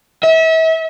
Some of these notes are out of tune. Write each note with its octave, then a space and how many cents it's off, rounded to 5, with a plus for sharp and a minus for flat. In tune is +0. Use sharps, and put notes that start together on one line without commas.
E5 -35